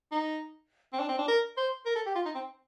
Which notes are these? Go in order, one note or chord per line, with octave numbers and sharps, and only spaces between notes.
D#4
C4
D4
C4
D4
A#4
C5
A#4
A4
G4
F4
D#4
C4